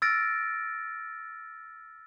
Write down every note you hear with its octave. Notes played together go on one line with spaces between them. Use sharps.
E6 F6 A6 A#6 D7